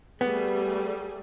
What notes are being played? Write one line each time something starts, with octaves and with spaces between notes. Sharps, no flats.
G3 A3 B3 G#4